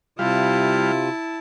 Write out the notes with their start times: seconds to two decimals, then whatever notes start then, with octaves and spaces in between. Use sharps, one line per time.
0.19 C3 G3 E4 F4 F5 A5